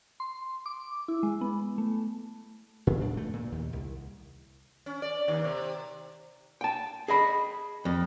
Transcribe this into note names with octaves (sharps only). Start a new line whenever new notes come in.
C6
D6
E4
G#3
B3
A3
A2
D4
A3
A#2
D#2
C2
C#4
D5
D#2
C3
G5 A5
G#4 D#5 B5
F2